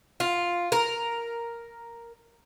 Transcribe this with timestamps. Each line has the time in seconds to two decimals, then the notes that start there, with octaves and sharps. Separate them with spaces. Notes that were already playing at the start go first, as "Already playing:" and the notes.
0.20 F4
0.72 A#4